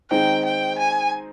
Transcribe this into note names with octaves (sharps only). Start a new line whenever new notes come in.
D#3 G#3 C4 D#4 G5
G5
G#5